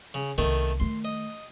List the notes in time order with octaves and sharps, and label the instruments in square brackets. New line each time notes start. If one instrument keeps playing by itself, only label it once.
[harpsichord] C#3
[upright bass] C2 B3 [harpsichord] D#3 A3
[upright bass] D#3 A3 [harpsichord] C6
[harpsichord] D#5